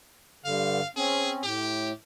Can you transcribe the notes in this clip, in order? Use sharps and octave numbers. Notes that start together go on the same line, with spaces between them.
G2 D3 F5
C4 C#4 G#4
A2 G4